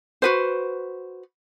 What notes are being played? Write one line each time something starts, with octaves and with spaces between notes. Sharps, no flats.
F#4 B4 C5